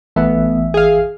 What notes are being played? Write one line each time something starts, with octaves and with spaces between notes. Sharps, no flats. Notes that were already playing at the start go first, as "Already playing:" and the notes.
A1 E3 A3 B3 E5
G#4 F5